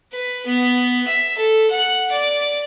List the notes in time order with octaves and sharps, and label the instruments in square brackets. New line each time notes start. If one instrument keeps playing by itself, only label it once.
[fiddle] B4
B3
E5
A4
F#5
D5